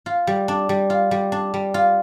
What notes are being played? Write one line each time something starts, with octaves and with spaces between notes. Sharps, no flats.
F4
G3
D4
G3
F4
G3
D4
G3
F4